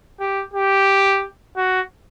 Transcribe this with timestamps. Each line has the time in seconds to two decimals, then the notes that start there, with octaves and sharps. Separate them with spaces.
0.20 G4
0.54 G4
1.57 F#4